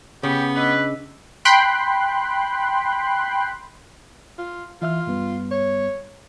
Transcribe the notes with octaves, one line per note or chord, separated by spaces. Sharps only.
C#3 B3 G4
D4 B4 D#5 E6
G5 B5 C6 F#6
F4
E3 F4 E5 F6
G2 G3 B3
C#5